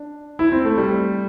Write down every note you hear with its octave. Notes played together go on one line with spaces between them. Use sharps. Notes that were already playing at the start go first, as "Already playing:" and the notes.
Already playing: D4
E4
C4
A3
G3